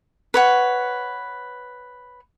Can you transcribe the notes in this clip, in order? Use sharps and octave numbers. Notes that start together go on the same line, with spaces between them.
B4 C#5 F#5